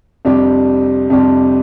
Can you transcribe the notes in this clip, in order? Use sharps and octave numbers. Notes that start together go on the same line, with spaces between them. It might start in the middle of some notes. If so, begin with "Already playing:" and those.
F2 C3 G3 D4 G4
F2 C3 G3 D4 G4